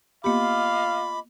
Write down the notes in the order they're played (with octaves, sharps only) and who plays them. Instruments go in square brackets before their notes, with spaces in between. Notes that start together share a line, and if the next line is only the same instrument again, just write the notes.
[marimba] A#3 B3 G4 [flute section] F4 D#5 D6 [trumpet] F5 [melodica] B5